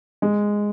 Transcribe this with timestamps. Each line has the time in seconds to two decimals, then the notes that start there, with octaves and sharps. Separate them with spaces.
0.22 G#3